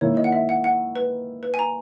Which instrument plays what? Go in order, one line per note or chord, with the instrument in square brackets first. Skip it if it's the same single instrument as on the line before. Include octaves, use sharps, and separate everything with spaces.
[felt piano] D#3 A#3 E4 [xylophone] C#5
[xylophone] D#5
F#5
E5
F#5
F#5
B4
B4
G#5
A#5